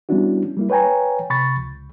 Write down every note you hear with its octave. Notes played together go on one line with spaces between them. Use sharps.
G3 B3 C#4 D4 E4 F#4
G3 A#3 E4
B4 C#5 G5 G#5 A#5
C3 B5 C#6 A6
C#2